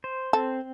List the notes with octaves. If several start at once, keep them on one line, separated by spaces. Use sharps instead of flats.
C5
C4 A4